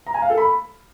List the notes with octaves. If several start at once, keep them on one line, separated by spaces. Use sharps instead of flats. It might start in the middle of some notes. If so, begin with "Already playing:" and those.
A#5
G#5
F5
A4
B5